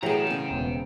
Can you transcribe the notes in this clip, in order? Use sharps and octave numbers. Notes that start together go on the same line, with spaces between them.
A2 E3 F#3 G4 G#4 G5 A#5
C#3 C4
E1 B3